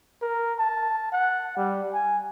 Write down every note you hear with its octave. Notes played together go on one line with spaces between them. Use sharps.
A#4
A5
F#5
G3
G#5